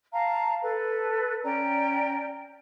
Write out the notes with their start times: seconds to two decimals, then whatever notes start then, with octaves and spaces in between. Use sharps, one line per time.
0.13 F5 A5 A#5
0.62 A4 B4
1.43 C#4 D5 G5 A#5